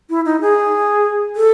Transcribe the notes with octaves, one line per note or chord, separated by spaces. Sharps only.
E4
D#4
G#4
A4